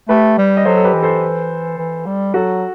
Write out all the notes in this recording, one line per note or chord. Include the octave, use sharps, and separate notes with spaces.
A3 G4 B4
G3
D#5
F#3 A4 C5
A4
G4 B4
E3
A4 C5
E3
G3
F#3 F#4 A4